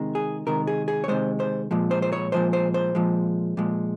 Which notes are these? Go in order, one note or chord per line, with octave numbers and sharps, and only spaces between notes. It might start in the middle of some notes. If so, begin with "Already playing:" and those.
Already playing: C3 D#3 G#3
G#4
C3 D#3 G#3 A#4
G#4
G#4
C#5
C3 D#3 G#3 C5
C5
A#2 F3 G#3
C5
C5
C#5
A#2 F3 G#3 C5
C5
C5
A#2 F3 G#3
A#2 F3 G#3